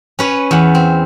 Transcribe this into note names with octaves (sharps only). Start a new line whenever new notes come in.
C#4 B4 C#5
E2 F#5
C4